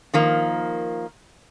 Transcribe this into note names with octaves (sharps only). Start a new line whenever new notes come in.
D#3 F3 A#3